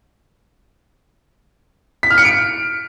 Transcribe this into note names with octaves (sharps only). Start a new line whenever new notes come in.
B6
F6
C#7
D7